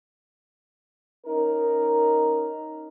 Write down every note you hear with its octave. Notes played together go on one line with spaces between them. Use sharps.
C#4 D#4 A#4